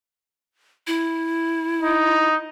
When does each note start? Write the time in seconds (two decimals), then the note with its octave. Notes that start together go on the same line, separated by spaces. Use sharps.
0.87 E4
1.82 D#4